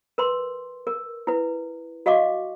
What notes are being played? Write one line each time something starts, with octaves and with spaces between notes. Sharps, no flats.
A#4 B4 C6
A#4
E4 B4
F#4 D#5 F5 C#6 D6